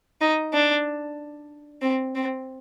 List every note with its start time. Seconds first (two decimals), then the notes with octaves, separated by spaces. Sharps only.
0.21 D#4
0.54 D4
1.82 C4
2.15 C4